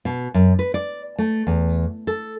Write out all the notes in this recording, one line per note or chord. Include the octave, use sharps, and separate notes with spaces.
B2
F#2
B4
D5
A3
E2
A4